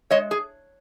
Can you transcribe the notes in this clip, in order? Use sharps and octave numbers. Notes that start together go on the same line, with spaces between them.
G#3 C#5 D#5
G#4